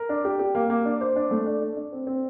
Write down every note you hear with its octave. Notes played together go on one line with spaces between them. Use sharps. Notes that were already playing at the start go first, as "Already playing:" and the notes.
Already playing: A#4
D4
G4
G4
A#3
A#3
D4
C5
D4
A3
D4
D4
D4
C4
C4